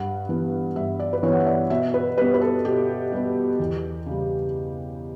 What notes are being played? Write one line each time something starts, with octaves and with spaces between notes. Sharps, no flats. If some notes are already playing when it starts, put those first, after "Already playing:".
Already playing: G2 F#5
E3 B3
G2 E5
D5
B4
E3 B3 C#5
F#5
E5
D5
B2 E5
B4
G3 B3 B4
B4
A4
B2 G4
G3 B3
E2
C#3 G3